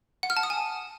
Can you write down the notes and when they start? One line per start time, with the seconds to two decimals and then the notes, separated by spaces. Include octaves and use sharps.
0.23 F#5
0.30 F6
0.37 A5
0.43 D#6
0.50 G#5